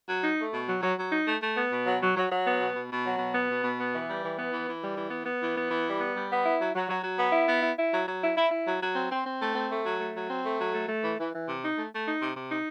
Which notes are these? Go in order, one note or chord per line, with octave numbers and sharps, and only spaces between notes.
F#3
D#4
A3
B2
F#3
F#3
F#3
D#4
A3
A3
B3
B2
F#3
F#3
F#3
F#3
B3
B2
B2
B2
F#3
B2
B3
B2
B2
B3
E3
G3
E3
B3
E3
E3
G3
E3
B3
B3
E3
B3
E3
G3
B3
G3
B3
E4
F#3
F#3
F#3
F#3
B3
E4
B3
E4
E4
F#3
F#3
E4
E4
E4
F#3
F#3
C4
C4
C4
A3
C4
A3
F#3
A3
F#3
C4
A3
F#3
A3
A3
E3
E3
E3
C3
D#4
A3
A3
D#4
C3
C3
D#4